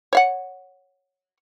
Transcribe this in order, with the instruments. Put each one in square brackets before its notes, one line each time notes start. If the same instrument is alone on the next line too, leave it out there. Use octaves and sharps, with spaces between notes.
[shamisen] C#5 F5 F#5